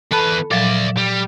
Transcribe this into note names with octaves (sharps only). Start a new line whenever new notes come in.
E2 A4 B4 A5 B5
A#2 F3 F#3 D5 E5
G3